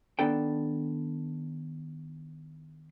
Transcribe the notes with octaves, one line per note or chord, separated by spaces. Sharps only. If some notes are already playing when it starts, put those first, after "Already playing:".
D#3 B3 D4 A4 G5